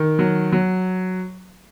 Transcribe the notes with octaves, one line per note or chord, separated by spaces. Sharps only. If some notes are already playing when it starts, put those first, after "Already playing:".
Already playing: D#3
F#3
F#3